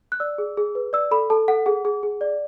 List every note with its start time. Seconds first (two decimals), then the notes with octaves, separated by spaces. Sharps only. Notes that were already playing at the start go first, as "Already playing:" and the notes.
0.12 F#6
0.20 D5 E6
0.38 G#4
0.57 G#4
0.75 B4
0.93 D5 E6
1.11 A4 B5
1.30 A4 A5
1.48 A4 F#5
1.66 G#4 F#5
1.85 G#4
2.03 G#4
2.21 D5